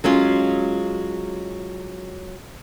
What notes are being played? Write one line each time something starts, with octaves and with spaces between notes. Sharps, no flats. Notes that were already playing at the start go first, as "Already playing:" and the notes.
F#3 G#3 C#4 F4